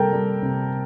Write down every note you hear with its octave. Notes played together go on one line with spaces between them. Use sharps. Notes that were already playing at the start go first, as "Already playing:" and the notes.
Already playing: C3 G3 A4 A#4 G5 A5 A#5
G3
C3